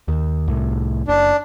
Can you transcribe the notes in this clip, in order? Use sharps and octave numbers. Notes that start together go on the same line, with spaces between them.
D#2
C2 A2
F#1 D4